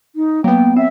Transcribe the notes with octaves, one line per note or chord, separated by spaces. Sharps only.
D#4
F#3 A#3 B3 G5
C4 E5